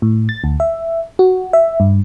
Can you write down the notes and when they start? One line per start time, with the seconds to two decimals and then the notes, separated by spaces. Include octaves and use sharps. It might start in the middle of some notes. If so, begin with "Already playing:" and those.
0.02 A2
0.29 A6
0.44 D2
0.60 E5
1.19 F#4
1.53 E5
1.80 G2